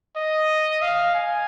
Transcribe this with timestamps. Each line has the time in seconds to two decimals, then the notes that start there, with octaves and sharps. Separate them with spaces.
0.16 D#5
0.82 F5
1.15 G#5